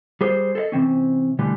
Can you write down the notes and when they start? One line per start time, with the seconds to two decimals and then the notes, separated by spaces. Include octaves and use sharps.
0.21 G3 G#4 C5
0.55 A4 C5 D#5
0.72 C3 E3 C4 C#4
1.39 B2 D3 E3 G3 A3